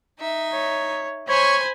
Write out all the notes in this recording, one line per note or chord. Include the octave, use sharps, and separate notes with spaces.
D#4 E5
C#5
C5 C#5 G#5 B5 G#6